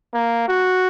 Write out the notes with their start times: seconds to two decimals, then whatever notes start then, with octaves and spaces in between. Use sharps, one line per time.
0.13 A#3
0.48 F#4